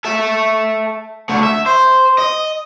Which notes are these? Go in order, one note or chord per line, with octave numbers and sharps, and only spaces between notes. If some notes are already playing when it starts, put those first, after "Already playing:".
A4 E5
D3 A3
E5
C5
D#5